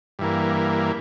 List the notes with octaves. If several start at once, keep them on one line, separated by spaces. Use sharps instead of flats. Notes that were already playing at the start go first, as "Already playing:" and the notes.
G2 E3 A#3